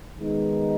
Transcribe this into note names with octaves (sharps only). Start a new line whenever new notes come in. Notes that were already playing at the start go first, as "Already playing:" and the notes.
D#3 G#3 B3 D#4